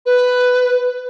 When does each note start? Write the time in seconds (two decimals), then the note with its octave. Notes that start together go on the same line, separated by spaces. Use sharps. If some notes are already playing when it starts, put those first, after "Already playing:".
0.06 B4